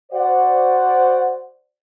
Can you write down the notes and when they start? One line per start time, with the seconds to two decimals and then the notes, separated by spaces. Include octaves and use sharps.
0.12 F#4 C5 D5 F#5